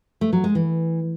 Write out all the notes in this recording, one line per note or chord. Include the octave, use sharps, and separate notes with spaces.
A3
F#3
G#3
E3